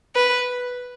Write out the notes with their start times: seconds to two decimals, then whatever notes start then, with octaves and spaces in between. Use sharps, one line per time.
0.15 B4